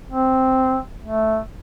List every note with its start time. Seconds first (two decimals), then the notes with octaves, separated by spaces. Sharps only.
0.11 C4
1.05 A3